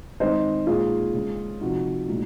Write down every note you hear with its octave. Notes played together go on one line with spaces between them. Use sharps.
D#3 G#3 C4 D#4 C5 D#5
A#2 G#3 D#4 F4 G#4
C#3 G#3 C#4
C3 F3 C4 D#4 F#4
A#2 G#3 D#4